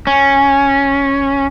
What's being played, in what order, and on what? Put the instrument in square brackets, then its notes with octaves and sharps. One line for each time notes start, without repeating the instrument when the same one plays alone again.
[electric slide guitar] C#4